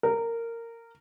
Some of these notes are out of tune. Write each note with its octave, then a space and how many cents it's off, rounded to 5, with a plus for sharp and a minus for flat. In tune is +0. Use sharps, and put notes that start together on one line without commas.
A#4 -15